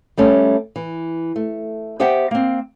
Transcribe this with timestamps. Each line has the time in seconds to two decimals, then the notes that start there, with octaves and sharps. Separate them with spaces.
0.17 G3 A3 C#4
0.76 E3
1.36 A3
2.00 B3 G4 C5 E5 F#5 G5
2.31 A#3 C4